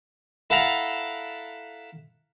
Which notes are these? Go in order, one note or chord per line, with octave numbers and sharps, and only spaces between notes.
E4 A4 F5 F#5 A5 A#5